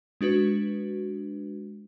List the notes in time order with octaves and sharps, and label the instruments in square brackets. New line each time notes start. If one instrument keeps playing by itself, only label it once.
[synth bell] G#3 D4 F#4 B4